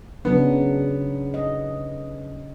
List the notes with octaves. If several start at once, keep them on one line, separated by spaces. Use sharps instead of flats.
C#3 F#3 B3 D4
D#5